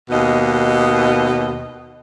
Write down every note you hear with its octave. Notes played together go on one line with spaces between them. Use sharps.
D#2 B2 D#5